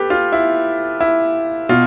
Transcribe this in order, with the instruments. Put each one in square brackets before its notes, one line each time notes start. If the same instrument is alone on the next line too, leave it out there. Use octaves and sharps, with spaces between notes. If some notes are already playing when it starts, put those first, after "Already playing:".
Already playing: [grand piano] G4 A4 B4
F4
E4
E4
B2 F4